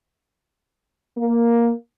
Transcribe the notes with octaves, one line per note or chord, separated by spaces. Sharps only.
A#3